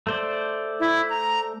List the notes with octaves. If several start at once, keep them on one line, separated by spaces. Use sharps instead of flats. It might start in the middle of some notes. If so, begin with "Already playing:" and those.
A3 C5 D5
E4
A#5